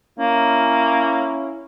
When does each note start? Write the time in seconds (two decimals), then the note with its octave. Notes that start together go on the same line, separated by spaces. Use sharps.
0.19 A#3 C#4 E4